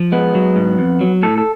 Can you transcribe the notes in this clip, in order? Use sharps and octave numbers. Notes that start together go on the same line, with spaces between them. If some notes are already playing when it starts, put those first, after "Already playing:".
Already playing: F3
G#3 B3
F#3
G#2
F2
F#3
A2 A4
A4